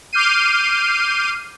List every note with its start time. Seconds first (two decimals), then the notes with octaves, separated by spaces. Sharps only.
0.13 D6 F6 G6 C7 D#7